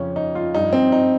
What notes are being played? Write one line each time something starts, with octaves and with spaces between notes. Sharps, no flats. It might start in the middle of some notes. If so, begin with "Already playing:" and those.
Already playing: F2 C#3 F3 C#4
D#4
F4
G2 F3 D#4
C4
D#4